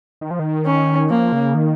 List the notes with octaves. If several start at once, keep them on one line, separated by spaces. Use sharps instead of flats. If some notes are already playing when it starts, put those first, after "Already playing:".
D#3
F3
D#3
C#4
F3 A#3
C#3
D#3